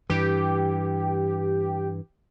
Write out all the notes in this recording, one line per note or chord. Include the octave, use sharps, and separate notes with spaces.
G2 E3 G4